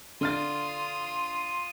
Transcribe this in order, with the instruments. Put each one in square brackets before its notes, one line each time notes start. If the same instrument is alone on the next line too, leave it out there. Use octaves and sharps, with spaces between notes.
[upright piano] D3 F6 A6 [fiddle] F4 D#6 [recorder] C6